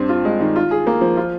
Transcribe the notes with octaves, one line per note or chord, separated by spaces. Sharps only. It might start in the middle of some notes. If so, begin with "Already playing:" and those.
Already playing: G2 C4
F4
G#3
D#3
F4
G#4
A#3
F3
F4